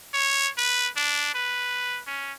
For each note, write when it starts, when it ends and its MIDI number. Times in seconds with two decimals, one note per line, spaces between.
0.14 0.50 73
0.57 0.89 71
0.96 1.33 62
1.35 2.00 71
2.07 2.33 61